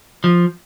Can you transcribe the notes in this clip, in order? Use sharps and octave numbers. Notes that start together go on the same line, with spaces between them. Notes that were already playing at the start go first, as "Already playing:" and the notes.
F3